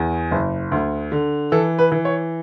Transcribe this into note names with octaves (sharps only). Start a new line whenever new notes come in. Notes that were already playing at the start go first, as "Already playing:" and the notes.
Already playing: E2
F#1
D2
D3
E3 A4
B4
E3
C#5